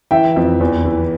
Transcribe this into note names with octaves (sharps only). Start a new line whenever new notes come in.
E3 E5 G5
F2
E2
E3